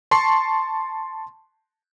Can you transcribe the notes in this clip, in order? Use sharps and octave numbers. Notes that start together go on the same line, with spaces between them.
A5 C6 C#6 C7